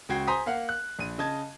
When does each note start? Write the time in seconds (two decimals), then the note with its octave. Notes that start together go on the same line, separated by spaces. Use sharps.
0.09 C#2 F#4 G5 G#6 C7
0.27 C5 G#5 A#5 C6 D#6 B6
0.46 A#3 F5 F#5
0.69 F#6
0.99 A#1 D#7
1.18 C#3 D#5 A5 G#6